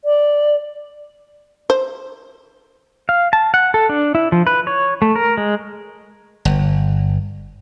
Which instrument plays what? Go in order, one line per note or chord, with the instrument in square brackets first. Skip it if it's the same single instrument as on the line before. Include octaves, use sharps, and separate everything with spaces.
[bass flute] D5
[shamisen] C5
[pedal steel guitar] F5
A5
F#5
A4
D4
E4
F3
B4
C#5
A3
A#4
G#3
[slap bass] G1